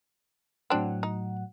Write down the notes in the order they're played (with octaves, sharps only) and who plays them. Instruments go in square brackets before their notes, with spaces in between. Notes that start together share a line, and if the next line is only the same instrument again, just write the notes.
[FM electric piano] A2 F#3 F#5 [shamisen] C4 D4
[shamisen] D#4